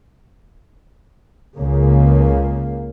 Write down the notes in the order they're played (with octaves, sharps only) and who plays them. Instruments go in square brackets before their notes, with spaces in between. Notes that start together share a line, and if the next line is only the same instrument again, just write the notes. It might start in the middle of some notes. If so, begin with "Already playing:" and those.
[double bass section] C#2 C#3 A#3